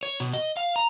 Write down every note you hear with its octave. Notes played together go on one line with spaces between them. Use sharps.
C#5
B2
D#5
F5
A#5